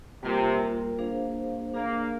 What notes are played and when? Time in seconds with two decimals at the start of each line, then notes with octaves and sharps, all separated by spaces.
0.22 C3 G3 A#3 F4 A#4
0.98 A#3 D4 G#4 C5 F5
1.74 A#3 D4 G#4 D5 F5